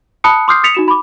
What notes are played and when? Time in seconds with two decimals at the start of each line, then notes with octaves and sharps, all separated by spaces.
0.24 A5 B5 D#6 F#6 C#7
0.48 C6 D6 D#6 F6 G6 C7
0.63 D#6 A6 B6 C#7 F7
0.75 D#4 F#4 E7
0.88 B5 D6